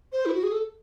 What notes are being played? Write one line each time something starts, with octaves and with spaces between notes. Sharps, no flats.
C5
E4
F#4
G#4
A4